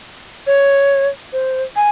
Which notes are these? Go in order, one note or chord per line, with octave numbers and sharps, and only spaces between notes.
C#5
C5
G#5